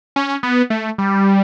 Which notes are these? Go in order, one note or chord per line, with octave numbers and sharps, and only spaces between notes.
C#4
B3
A3
G3